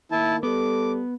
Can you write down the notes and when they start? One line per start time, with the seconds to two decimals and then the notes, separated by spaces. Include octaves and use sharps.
0.11 D#3 A#3 E4 A5
0.43 G3 B3 A4 D6